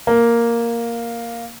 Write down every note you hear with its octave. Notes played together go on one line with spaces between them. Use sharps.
A#3